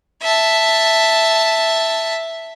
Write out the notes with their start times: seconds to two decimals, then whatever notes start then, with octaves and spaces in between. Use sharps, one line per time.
0.22 E5 A5